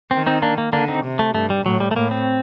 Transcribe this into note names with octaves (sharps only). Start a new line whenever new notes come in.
D#3 C4
C4 D#4
A#3 D4
A#3
D3 A#3 D4
C4 D#4
C3
A3
G2 A3
G3
A2 F#3
G3
A3
A2 A#3
C4